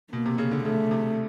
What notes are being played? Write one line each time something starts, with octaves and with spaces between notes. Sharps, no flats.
B2 A#3
C3
C#3
D3
C#3 A3
C3